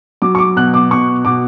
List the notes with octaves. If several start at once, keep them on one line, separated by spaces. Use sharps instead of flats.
F#3 D6
C#6
D6
B2 F#6
D6
B2 C#6
B2 D6